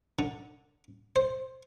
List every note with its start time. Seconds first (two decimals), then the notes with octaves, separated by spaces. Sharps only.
0.19 D3
1.16 C5